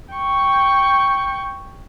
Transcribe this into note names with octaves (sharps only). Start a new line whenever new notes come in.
G5 C#6